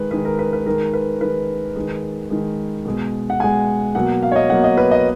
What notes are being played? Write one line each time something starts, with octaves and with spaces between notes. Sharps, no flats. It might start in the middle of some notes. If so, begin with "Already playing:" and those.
Already playing: D#3 G#3 B4
D#3 G#3 B4
A#4
B4
B4
D#3 G#3 A#4
B4
D#3 G#3 B4
D#3 G#3
D#3 G#3
B2 G#3
F#5
B2 G#3 G#5
B2 F#3 A#3 F#5
F5
C#5
D#5
B2 F#3 A#3 F#5
D#5
B4
D#5